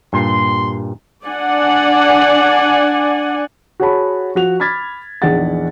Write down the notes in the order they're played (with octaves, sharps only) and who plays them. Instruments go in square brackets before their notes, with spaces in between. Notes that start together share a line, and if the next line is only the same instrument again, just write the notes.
[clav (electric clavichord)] G2 A#2 [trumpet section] C6
[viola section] D4 D5 F#5 G#5
[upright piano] F#4 G#4 C#5 F#5 A5 B5
F3 F#4 F7
B5 D6 F6 G#6 A6 B6
A#1 E2 D#4 G#4 F#5 A6